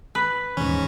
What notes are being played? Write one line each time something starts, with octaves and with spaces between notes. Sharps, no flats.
B4
D#1 G#2 E3 C#4